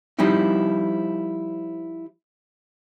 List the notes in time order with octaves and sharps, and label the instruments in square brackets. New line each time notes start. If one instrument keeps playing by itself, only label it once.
[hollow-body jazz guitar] F3 G3 C4 D#4 E4